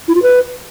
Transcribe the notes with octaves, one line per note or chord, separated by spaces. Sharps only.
E4
F4
B4